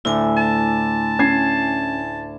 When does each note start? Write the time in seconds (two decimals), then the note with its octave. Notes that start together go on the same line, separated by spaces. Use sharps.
0.05 D2 A2 E4 G#5
0.38 A5
1.19 C#4 G#6 C7